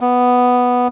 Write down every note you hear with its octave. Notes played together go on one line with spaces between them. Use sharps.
B3